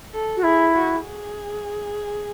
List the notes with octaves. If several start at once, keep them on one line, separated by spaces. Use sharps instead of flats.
A4
F#4
E4 G#4
F#4
G#4